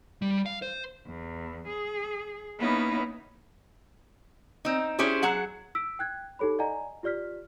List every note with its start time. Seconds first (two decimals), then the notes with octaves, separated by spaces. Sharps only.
0.22 G3
0.46 F5
0.62 C5
1.06 E2
1.68 G#4
2.58 A#3 B3 C#4 D#4 E4
4.65 C4 D#4
4.99 C#4 E4 G4 G#4 C5
5.23 F#3 G#4 F#5
5.75 E6 B6 D7
5.99 G5 F#6 G#6
6.39 D#4 G4 A4 C#5 B5
6.59 D5 D#5 F#5 G#5 A#5
7.03 F4 G4 D5 F6 B6